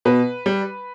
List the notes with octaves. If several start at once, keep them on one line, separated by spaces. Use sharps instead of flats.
B2 B4
G3